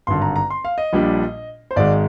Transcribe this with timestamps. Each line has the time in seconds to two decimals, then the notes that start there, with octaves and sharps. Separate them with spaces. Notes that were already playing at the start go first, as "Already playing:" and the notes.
0.07 G#1 G2 D3 C6
0.22 A#5
0.36 A#5
0.50 C6
0.65 F5
0.78 D#5
0.93 A#1 A#2 G3 D4
1.71 C5
1.76 G#1 G#2 D#3 G#3 D5